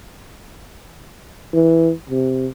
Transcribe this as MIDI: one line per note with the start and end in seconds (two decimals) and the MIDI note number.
1.53 1.92 52
2.10 2.47 48